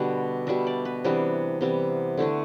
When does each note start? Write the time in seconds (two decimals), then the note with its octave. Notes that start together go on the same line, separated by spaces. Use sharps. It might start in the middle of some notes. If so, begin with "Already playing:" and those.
Already playing: B2 D3 G3 D4 F#5
0.47 B2 G3 D4 E5
0.67 D5
0.85 B4
1.04 C3 E3 G3 B3 D4
1.61 C3 E3 G3 B3
2.17 D3 A3 D4 E4